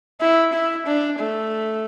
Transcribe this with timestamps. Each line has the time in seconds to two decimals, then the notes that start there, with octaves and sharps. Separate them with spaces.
0.21 E4
0.53 E4
0.87 D4
1.19 A3